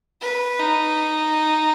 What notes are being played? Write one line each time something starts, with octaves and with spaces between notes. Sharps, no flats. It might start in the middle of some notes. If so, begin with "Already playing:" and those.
B4
D#4